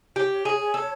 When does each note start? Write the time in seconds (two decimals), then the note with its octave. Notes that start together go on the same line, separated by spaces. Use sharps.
0.16 G4 C#5
0.45 G#4
0.74 A4